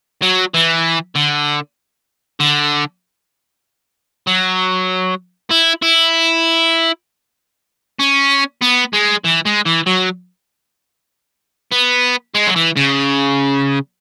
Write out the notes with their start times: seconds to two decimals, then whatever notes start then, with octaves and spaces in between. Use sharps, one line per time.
0.22 F#3
0.54 E3
1.16 D3
2.40 D3
4.27 F#3
5.51 E4
5.82 E4
7.99 C#4
8.61 B3
8.93 G#3
9.24 E3
9.45 G#3
9.65 E3
9.86 F#3
11.72 B3
12.35 G#3
12.47 F#3
12.56 E3
12.77 C#3